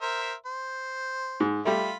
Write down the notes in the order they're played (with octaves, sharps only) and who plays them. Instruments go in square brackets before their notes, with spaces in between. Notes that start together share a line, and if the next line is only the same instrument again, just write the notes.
[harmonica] A#4 C5 E5
C5
[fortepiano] G#2
[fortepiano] G3 A3 [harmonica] F4 B5